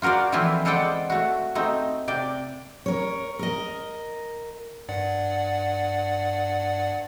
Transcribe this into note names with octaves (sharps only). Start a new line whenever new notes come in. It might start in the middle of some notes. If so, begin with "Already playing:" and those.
F4 F#4 A#4 C5 D5
E3 F3 A3 C4 E4 F4
G#3 A4 C5 D5 F#5 G5
A3 F#4
A3 C4 D#4
C3 D5 G5
A#4 C#5
A#4 D#5
G2 D5 F#5